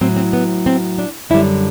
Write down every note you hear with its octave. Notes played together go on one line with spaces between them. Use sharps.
A2 F#3 C4
C4
B3
C4
D4
F#2 D3 G3 E4